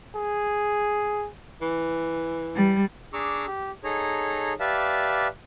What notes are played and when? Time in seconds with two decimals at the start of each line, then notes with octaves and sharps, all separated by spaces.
0.15 G#4
1.61 E3
2.55 G3
3.13 D4 G#4 A#5 C#6 D6 E6
3.47 G4
3.84 D#4 G#4 A4 C#5 A#5
4.60 G4 B4 D5 E5 F5 A5